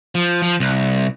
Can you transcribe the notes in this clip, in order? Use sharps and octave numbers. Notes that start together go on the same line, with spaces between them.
F3
F3
C2